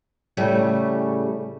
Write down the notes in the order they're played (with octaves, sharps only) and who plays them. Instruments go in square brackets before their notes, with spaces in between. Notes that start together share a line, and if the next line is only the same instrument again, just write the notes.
[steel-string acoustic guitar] A2 C#3 G3 A3